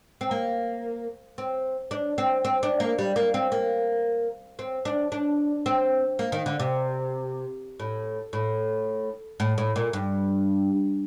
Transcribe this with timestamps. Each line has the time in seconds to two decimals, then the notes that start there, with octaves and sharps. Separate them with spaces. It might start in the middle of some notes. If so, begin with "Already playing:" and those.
0.21 C4
0.31 A#3
1.38 C4
1.91 D4
2.18 C4
2.45 C4
2.63 D4
2.80 A#3
2.99 G3
3.16 A#3
3.34 C4
3.52 A#3
4.59 C4
4.85 D4
5.12 D4
5.66 C4
6.19 A#3
6.32 D#3
6.46 D3
6.60 C3
7.80 A2
8.33 A2
9.40 A2
9.58 A2
9.76 A#2
9.93 G2